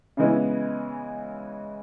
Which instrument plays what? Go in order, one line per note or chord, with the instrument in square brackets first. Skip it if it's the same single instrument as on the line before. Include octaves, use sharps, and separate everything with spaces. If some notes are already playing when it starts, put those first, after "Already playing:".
[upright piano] C#3 E3 G#3 B3 E4